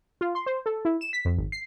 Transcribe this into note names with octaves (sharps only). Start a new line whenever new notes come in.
F4
C6
C5
A4
E4
E7
B6
F2
G#1
C7